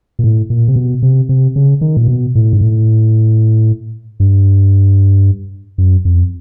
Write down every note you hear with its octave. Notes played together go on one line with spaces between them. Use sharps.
A#2
A2
A#2
C3
B2
C3
C3
C#3
D#3
A#2
B2
A2
G#2
A2
G2
F#2
F2